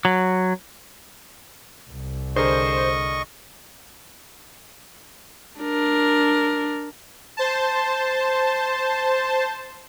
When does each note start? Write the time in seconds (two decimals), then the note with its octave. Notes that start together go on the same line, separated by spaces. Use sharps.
0.05 F#3
1.90 C2
2.36 D3 G#4 A#4 C5 D#5 C#6
5.60 D4 A#4
7.37 C5 A5